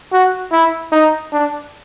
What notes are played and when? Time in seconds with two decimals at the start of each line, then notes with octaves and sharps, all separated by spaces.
0.13 F#4
0.52 E4
0.92 D#4
1.33 D4